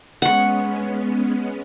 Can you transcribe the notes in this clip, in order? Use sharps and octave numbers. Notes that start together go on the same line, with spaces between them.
G#3 B3 C#4 F#5 C#6